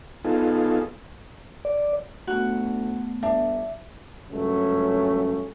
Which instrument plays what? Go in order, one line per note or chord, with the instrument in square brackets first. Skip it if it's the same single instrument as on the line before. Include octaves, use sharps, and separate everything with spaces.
[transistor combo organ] B3 D#4 F4 G#4 A4
[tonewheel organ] D5
[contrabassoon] D2 [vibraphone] A3 B3 [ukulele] F#4
[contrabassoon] G1 [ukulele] D4 [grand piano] E5
[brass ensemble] C#2 G2 C#3 F#3 A3 C#4